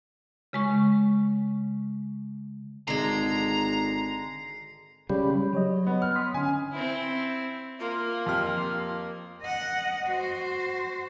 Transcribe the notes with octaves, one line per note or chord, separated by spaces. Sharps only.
C#3 G#3 C#6
G#1 D3 G#3 A#5 C7
C#3 G3
F#3 C#5 D#5
B3
F6
C6 D#6 B6
D3 C#4 G#5
C4 E4
A#3 F4
F2 G4 F6
D#5 F#5
F#4 C5